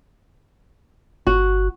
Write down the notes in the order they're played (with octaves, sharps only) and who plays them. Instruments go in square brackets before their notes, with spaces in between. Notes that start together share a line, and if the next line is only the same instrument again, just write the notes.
[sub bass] G1 [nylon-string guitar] F#4